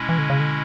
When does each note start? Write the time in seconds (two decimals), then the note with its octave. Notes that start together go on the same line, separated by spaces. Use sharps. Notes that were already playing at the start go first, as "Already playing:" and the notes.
Already playing: B2 G#3 C#4 E4
0.09 E3
0.19 D3
0.30 C#3
0.40 D3